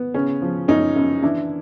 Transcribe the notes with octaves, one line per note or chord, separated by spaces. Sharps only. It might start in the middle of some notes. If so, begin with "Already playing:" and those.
Already playing: B3
C#3 C#4
F3
F#2 C#4 D#4
F#2
E3 D4 E4